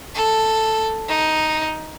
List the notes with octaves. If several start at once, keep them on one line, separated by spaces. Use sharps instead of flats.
A4
D#4